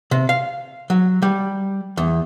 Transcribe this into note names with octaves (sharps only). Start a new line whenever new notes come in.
C3
F5
F#3
G3
E2